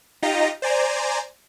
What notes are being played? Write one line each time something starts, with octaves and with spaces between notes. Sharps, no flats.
D#4 F4 G4 D#5 A#5
C5 D5 G#5 A#5